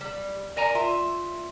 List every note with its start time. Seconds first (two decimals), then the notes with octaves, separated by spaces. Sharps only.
0.01 G3
0.57 A#4 D5 G#5 A#5
0.75 F4 E5